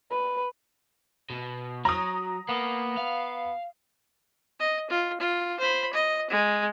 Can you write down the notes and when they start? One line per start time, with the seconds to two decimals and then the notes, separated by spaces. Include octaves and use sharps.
0.10 B4
1.30 B2
1.85 F#3 A#5 D#6
2.49 A#3 B3
2.98 F5
4.60 D#5
4.90 F4
5.20 F4
5.59 C5 B5
5.93 D#5
6.30 G#3